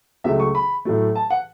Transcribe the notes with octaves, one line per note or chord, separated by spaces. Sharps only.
C#2 C#3 F#3 A3 E5
C#6
B5
A2 F#3 A3
A5
F#5